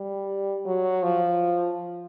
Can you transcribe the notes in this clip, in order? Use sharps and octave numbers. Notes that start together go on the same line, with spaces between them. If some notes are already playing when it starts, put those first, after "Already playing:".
Already playing: G3
F#3
F3